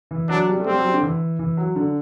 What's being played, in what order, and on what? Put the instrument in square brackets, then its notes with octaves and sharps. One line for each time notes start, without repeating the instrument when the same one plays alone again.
[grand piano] E3
[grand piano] F#3 [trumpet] D4
[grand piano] G3
A3
[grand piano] G3 [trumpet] C4
[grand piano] F#3
G3
D3
E3
E3
F#3
D3